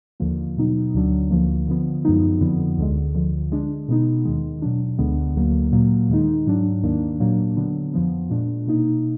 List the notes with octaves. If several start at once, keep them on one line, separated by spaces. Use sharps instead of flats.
D#2 D3 F3 A#3
B2 F#3 B3 D#4
D2 D3 F#3 D4
D2 D3 F3 A#3
D3 F3 B3
F#2 F3 G#3 B3 D#4
F2 D3 F3 B3
D2 D3 G#3
D2 D3 F3
D3 G#3 D4
B2 G#3 B3 D#4
D#2 D#3 G#3
B2 F#3 D4
D2 D3 G#3 B3 D4
D2 D3 F#3 A#3
A#2 F#3 A#3
D#2 D#3 G#3 D#4
G#2 F#3 D4
D#2 D#3 A#3 D4
A#2 F#3 A#3 D4
D3 F#3 B3 D4
F2 F3 B3
A#2 G#3 D4
B2 A#3 D#4